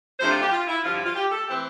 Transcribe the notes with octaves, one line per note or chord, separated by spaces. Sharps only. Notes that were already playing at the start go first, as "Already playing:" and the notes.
C3 F3 A3 D4 C5
F4
G4
F4
E4
G2 D3 F3 F4
E4
F4
G4
A4
E3 A3 C4 G4